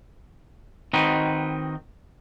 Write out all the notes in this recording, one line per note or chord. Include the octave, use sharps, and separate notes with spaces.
D#3 C4 D#4 F#4 B4